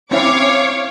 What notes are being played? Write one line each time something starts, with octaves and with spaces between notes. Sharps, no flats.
C4 C#4 E4 C#5 F5 D6